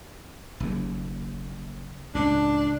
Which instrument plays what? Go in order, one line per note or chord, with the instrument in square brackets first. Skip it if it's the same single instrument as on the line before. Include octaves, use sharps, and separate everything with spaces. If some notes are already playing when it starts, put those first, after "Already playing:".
[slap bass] F#1 D#2
[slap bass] C#2 A2 [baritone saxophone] D4